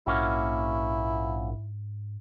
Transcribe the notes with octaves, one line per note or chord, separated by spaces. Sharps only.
A#1 G#2 A#3 C#4 E4 F#4